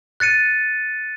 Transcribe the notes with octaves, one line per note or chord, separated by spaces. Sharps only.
F#6 A6 C#7 D#7